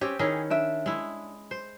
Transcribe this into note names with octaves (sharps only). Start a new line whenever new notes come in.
C4 C#4 G4
D#3 C#4 E4 G#4
D4 E5
G#3 E4
C5